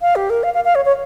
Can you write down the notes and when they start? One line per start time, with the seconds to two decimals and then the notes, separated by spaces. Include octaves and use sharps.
0.02 F5
0.16 G4
0.30 A#4
0.43 F5
0.54 F5
0.64 F5
0.75 C#5
0.85 C#5